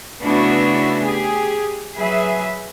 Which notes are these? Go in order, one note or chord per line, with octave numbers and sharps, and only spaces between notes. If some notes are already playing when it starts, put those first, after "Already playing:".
C#3 A3 B3 D4 E4 F#4
G4 G#4
F#3 G#4 B4 E5